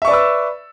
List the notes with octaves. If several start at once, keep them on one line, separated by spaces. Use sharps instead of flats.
B4 D5 E5 C#6 E6